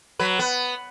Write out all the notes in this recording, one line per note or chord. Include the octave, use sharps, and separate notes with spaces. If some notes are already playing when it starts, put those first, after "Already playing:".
F#3 B4
B3